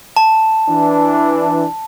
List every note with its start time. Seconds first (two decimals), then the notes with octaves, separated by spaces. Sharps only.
0.17 A5
0.68 E3 D4